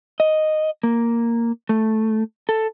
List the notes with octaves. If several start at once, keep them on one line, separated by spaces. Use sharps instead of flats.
D#5
A#3
A3
A4